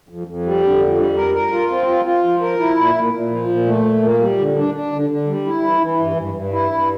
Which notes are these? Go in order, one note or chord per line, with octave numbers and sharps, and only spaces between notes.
F2
F2
G3
D3
F2
G3
A#4
A#4
F4
C4
F4
F4
F3
A#4
E4
A#2
A#2
A#2
F3
A#2
A3
A#2
A#3
G3
D3
D4
D4
D3
D3
G3
E4
E3
E3
G2
G2
G2
E4
G2